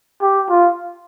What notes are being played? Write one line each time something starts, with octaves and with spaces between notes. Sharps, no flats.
G4
F4